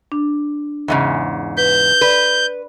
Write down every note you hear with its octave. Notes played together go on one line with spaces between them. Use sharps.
D4
E2 G#2 C#3
B4 G6
B4 D5